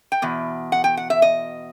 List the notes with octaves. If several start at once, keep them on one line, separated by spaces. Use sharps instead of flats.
G5
E2 B2
F#5
G5
F#5
E5
D#5